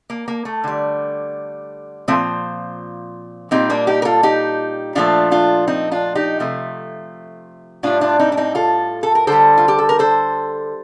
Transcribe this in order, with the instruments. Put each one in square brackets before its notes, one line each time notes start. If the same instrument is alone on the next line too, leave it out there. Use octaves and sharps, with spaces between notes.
[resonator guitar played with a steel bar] A#3
A#3
A3
D3 G3
A#2 F3 A3 C4
A#2 G3 C4 D#4
A#3 D4
D#4 G4
A#4
F4 A4
D#4 G4
A#2 F3 A3 D4 F4
D4 F4
C4 D#4
D4 F4
D#4 G4
C3 F3 A3
A2 G3 D4 F4
D4 F4
C4 D#4
D4
C4 D#4
F4 A4
A4
A#4
D3 G3 A4 C5
F4
G4
A4
A#4
A4 C5